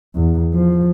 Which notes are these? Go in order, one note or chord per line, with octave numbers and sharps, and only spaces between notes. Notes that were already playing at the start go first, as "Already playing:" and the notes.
E2
F3